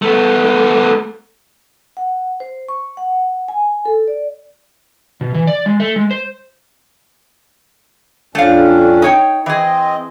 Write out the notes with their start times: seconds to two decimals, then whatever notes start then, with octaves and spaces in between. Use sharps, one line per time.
0.02 A3 B3
1.97 F#5
2.40 C5
2.69 C#6
2.97 F#5
3.48 G#5
3.85 A4
4.08 D5
5.21 B2
5.34 E3
5.47 D5
5.66 G#3
5.80 A3
5.96 G#3
6.11 C5
8.35 F2 A3 C#4 D4 F5
9.02 D#4 C#5 G5
9.46 E3 C4 G#4 D#5